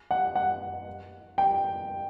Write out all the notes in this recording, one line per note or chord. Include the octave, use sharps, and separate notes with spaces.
F#5
F#5
G5